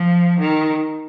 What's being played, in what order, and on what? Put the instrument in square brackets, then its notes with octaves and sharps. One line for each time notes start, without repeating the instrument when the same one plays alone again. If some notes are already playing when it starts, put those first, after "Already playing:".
Already playing: [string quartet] F3
D#3